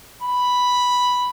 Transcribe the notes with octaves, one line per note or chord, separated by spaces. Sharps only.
B5